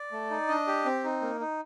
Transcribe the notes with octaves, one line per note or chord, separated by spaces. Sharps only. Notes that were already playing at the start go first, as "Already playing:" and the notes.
Already playing: D5
A3
D#4
D4 D#5
G4
C4
D#4
A#3
D#4